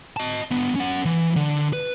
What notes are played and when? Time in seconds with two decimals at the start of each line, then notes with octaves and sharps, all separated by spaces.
0.17 D#5 A5
0.52 D3 B3
0.76 C#4 F#5
1.05 E3
1.36 D3
1.73 B4